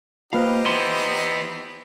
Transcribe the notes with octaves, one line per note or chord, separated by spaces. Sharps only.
A#3 D#4 F4 G4 B4 C5 F5
E3 B3 C6